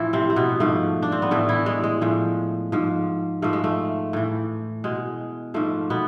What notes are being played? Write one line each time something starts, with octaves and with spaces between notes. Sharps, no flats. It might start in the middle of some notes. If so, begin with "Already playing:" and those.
Already playing: A2 E3 F3 E4
C3 C4
C4
B2 B3
G#2 F3 A3
D4
C4
B3
A2 E3 A3
E3 E4
G#3
G#3
A2 F3
G#2 F3
G#2 F3 A3
G#3
A3
A2 E3
B2 G#3
G#2 F3 A3
B2 B3